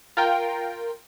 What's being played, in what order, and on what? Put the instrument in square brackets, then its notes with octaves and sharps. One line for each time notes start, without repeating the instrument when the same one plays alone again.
[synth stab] F4 A#4 G5